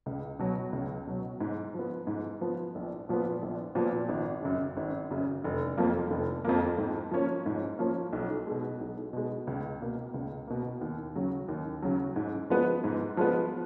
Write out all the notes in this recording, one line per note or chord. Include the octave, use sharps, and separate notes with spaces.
C#2
B2 F#3
C#2
B2 F#3
G#2
F3 B3
G#2
F3 B3
A#1
A#2 F3 B3
A#1
A#2 F3 B3
G#1
F#2 C#3
G#1
F#2 C#3
F1
F2 F3 A#3
F1
F2 F3 A#3
G#2
F3 A#3 C#4
G#2
F3 A#3 C#4
B1
B2 G#3
B1
B2 G#3
C#2
B2 A#3
C#2
B2 A#3
D#2
C#3 F#3
D#2
C#3 F#3
G#2
F3 G#3 B3
G#2
F3 G#3 B3